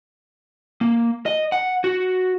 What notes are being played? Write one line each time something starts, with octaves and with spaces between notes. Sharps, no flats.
A#3
D#5
F#5
F#4